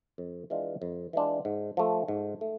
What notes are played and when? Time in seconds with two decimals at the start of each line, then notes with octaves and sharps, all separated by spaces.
0.18 F2
0.50 E3 G#3 D4 F4
0.82 F2
1.13 E3 G#3 D4 F4
1.45 G#2
1.77 F3 A3
2.08 G#2
2.41 A3